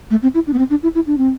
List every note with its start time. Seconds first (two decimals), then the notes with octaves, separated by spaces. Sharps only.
0.11 A3
0.23 C4
0.34 E4
0.47 D4
0.53 B3
0.58 C4
0.70 D4
0.83 E4
0.95 E4
1.07 D4
1.18 C4